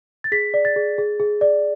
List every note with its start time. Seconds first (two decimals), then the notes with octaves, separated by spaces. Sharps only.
0.24 A6
0.32 G#4 B6
0.54 D5
0.65 A6
0.76 G#4
0.98 G#4
1.20 G#4
1.41 D5